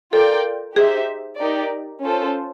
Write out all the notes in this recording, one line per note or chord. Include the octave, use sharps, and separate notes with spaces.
F4 A4 A#4 D5 G5
D#4 G4 G#4 C5 E5
D#4 G4 A#4 D5
C#4 F4 A4 C5